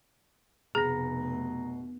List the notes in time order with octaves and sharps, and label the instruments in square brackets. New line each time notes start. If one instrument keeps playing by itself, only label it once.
[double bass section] F1 [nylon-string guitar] B2 [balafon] G#4 [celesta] A#5 A#6